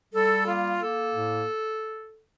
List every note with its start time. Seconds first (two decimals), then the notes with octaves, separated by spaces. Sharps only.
0.14 G3 A4
0.47 A#3 F4
0.81 A#3 A4
1.14 A2